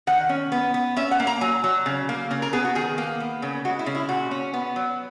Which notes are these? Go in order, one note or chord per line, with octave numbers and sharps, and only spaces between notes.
D#3 F#5
C#4
B3
B3
C#4 E5
F#5
A#3
A#5
F#3 G#5
F#3
C#3
A#3
C#3 A#4
A#4
B3 G#4
F#4
D#3 G#4
A#3
B3
C#3
G#3 F#4
E4
C#3
E4
A#2 F#4
C#4
B3
F#3